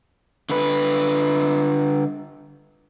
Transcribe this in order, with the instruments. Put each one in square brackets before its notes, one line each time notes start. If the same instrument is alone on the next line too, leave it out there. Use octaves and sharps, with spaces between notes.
[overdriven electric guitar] D3 B4